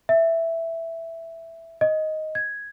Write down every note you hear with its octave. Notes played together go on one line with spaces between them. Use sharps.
E5
D#5
G#6